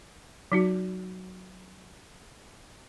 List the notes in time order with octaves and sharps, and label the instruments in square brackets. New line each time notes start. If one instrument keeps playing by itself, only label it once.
[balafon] F#3 D#4 F#4